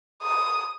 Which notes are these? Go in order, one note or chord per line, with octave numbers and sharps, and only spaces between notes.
D#6